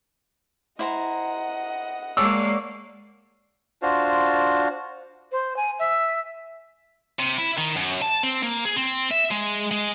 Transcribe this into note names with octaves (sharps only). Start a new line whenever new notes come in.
E4 C5 D#5 F#5 A#5
G#3 A#3 C#5 D5 A5 E6
D4 F4 F#4 C5
C5
G#5
E5
C3
E4
D#3
F#2
A5
C4
A#3
G#4
C4
E5
G#3
G#3